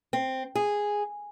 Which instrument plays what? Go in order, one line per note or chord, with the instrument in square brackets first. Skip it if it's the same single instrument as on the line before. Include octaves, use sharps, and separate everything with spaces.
[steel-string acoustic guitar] C4
G#4